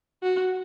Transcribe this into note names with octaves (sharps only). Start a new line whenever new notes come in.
F#4